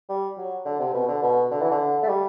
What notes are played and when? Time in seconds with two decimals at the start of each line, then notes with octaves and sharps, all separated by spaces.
0.09 G3
0.38 F#3
0.65 D3
0.79 C3
0.94 B2
1.08 D3
1.22 B2
1.51 D3
1.62 E3
1.71 D3
2.03 A3
2.08 G3